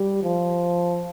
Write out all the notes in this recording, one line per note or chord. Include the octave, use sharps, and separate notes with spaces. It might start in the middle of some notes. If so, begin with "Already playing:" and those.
Already playing: G3
F3